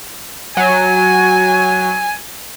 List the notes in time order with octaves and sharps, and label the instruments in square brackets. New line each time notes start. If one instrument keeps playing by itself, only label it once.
[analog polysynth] F#3 [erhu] G#5